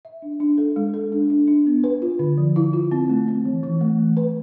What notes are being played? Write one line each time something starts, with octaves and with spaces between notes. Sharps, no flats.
E5
D4
D4
A4
G#3
A4
D4
D4
D4
B3
B4
F4
D3
F3
E4
F4
C4
A3
C4
E3
E3
A3
A3
B4